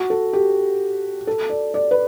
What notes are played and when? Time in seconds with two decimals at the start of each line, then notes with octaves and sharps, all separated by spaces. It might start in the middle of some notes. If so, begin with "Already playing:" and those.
Already playing: F#4
0.10 A4
0.33 G4
1.27 A4
1.50 D5
1.74 D5
1.91 B4